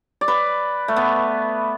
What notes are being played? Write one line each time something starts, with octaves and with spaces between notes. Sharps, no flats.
D5
B4
A3
B3